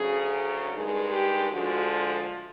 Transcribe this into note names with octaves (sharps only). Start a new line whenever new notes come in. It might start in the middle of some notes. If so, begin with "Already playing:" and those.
Already playing: D2 C#3 F#3 G#4
G2 D#3 G#3 G#4
G4
D2 D3 F3 G#3 F#4